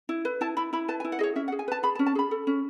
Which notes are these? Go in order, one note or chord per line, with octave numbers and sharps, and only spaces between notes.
E4
B4
E4 A5
E4 B5
E4 B5
B4 A5
G#5
E4
F#5
G#4 C#5 D#5
C#4 E5
F#5
G#4
G#5
B4 A5
G#4 B5
A5
C#4
A5
G#4 B5
A4
C#4